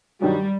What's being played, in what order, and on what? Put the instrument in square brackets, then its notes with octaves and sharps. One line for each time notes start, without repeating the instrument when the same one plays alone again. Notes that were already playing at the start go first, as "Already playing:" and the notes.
[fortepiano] G2 D#3 F#3 [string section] G3